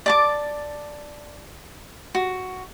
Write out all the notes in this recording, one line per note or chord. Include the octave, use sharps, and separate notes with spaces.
D5 A5 D6
F#4